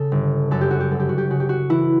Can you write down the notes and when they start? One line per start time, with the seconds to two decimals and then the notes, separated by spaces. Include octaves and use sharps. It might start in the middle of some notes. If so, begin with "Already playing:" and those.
Already playing: C#3 A4
0.12 G1
0.51 F#2 A4
0.61 G4
0.71 F#4
0.80 G4
0.91 G1 A4
1.00 G4
1.09 F#4
1.18 G4
1.30 C#3 F#4
1.40 G4
1.49 F#4
1.70 E3 E4